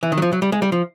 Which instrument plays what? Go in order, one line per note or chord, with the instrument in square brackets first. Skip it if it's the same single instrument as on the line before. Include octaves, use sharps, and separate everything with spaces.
[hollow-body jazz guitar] E3
D#3
F#3
F3
F#3
G3
G#3
G3
F3